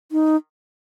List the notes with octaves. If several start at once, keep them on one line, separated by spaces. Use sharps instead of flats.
D#4